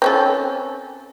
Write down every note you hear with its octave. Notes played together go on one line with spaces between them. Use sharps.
C4 C#4 A4